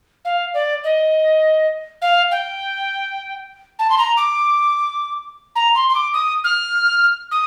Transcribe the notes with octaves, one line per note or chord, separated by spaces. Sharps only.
F5
D5
D#5
F5
G5
A5
C6
A#5
D6
A#5
C6
C6
D6
D#6
F6
D#6